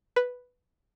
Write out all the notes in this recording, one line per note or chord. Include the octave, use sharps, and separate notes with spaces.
B4